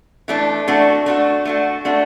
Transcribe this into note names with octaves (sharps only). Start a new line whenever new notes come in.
E3 A3 D4
A3 D4 F#4
A3 D4 F#4
A3 D4 F#4
A3 D4 F#4